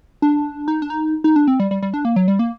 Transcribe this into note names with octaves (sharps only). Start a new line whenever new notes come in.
D4
D#4
D4
D#4
D#4
D4
C4
G3
G3
G3
D4
A#3
F#3
G3
A#3